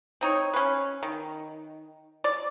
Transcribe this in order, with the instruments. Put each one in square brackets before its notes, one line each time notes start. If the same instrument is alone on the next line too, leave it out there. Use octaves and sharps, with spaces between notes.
[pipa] C4 D#4 C#5
C#4 B4
D#3
D5